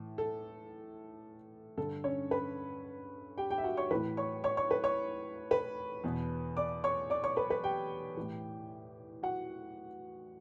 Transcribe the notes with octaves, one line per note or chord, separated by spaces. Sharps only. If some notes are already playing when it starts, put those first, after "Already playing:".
Already playing: A2 E3
A4
G2 D3 A4
C#4 C#5
B4 B5
G4 G5
G4 G5
E5
F#4 F#5
C#5 C#6
A2 E3 B4 B5
C#5 C#6
C#5 C#6
C#5 C#6
B4 B5
C#5 C#6
B4 B5
E2 B2
D5 D6
C#5 C#6
D5 D6
C#5 C#6
B4 B5
B4 B5
G4 G5
A2 E3
F#4 F#5